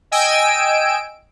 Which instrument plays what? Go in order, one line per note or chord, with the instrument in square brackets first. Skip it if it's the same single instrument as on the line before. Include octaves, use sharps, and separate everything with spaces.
[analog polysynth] D#5 G5 G#5 E6 D7